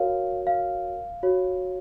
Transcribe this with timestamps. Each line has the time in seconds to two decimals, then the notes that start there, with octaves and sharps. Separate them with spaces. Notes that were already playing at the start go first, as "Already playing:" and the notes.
Already playing: F#4 A#4 C#5 F5
0.47 F5
1.23 F#4 C#5